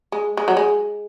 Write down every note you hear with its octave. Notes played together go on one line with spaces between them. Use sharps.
G#3
G#3
F#3
G#3